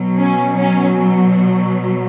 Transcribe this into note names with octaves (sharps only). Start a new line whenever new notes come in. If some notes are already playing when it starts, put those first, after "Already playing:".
Already playing: B2 F#3
C#4
C#4